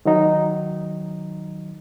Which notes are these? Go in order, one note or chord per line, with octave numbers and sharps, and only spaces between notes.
D#3 F#3 D#4